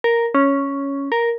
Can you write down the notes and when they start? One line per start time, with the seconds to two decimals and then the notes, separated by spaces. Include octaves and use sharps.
0.04 A#4
0.34 C#4
1.12 A#4